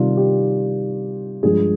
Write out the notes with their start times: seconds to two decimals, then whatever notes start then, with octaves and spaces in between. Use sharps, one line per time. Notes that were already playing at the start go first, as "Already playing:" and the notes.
Already playing: C3 D#3 G3 F4
0.17 G4
1.43 G2 F3 G#3 G#4